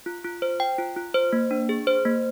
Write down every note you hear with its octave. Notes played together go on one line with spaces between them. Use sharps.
F4
F4
C5
G5
F4
F4
C5
A#3
D4
G#4
C5
A#3